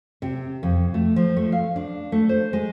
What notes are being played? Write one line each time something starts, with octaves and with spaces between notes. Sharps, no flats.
C3
F2
A3
F3
A3
F5
D4
A3
C5
G#3